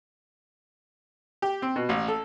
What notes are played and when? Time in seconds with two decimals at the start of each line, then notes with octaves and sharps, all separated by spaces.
1.42 G4
1.62 C4
1.76 B2
1.89 A1
2.08 A4